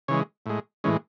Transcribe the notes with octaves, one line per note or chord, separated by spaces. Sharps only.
C#3 E3 G#3 C#5
A2 G#3
A2 E3 G#3 C#4